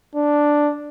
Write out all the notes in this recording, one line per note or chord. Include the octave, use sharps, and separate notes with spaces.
D4